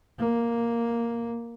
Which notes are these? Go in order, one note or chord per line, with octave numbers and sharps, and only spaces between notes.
A#3